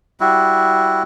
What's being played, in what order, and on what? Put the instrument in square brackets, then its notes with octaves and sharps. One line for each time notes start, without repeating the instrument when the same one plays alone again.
[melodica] G3 E4 F#4